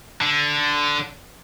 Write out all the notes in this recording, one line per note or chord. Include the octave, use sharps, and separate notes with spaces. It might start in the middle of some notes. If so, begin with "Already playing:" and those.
D3 D4